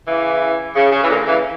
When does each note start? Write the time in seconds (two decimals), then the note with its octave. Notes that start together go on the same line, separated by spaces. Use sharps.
0.08 C#3 E3
0.76 C#3
0.92 C#3
1.04 E3
1.09 A#2 D3
1.26 C#3 E3